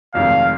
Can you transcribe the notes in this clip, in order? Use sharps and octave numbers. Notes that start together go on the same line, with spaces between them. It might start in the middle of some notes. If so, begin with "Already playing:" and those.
F1 F2 D#3 G#3 F5